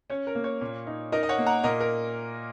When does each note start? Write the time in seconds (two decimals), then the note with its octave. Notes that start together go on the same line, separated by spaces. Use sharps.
0.10 C#4 C#5
0.27 A#4
0.35 A#3
0.44 C#5
0.61 A#2
0.87 D#4
1.12 D#4 A#4 D#5
1.23 D#5
1.29 C#5 F#5
1.38 A#3
1.46 F#5 A#5
1.64 A#2 A#4 D#5
1.80 A#4